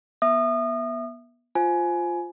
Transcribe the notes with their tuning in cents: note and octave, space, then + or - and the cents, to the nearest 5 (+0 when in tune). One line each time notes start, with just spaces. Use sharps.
B3 -30 E5 +0 D#6 -30
F4 +0 C5 +0 G#5 +20